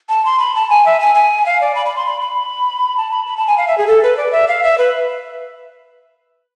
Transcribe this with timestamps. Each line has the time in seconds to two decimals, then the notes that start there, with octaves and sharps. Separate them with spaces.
0.09 A5
0.25 C6
0.39 B5
0.56 A5
0.70 G#5
0.86 E5
1.00 G#5
1.15 G#5
1.46 F5
1.61 D5
1.75 B5
1.86 B5
1.96 C6
2.06 B5
2.21 B5
2.97 A5
3.11 B5
3.27 B5
3.37 A5
3.47 G#5
3.58 F5
3.68 E5
3.78 G#4
3.87 A4
4.03 B4
4.17 D5
4.32 E5
4.48 F5
4.63 E5
4.78 B4